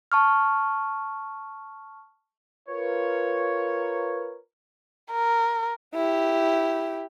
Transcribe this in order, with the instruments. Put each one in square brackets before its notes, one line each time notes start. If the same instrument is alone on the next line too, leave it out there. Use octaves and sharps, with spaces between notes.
[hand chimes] A5 C#6 F6
[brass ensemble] F4 A#4 B4 C#5
[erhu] A#4
[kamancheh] E4 G4